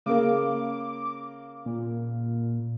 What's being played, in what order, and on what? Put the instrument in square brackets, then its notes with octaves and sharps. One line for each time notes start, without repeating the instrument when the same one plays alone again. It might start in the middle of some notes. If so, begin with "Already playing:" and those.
[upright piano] C#3 A#3 [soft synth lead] D6
[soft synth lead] A#2